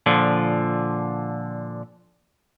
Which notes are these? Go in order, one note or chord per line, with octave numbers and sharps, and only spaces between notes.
A#2 D3 F3